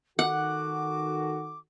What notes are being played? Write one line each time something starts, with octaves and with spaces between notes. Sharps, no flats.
D#3 F#4 A4 F#5 D6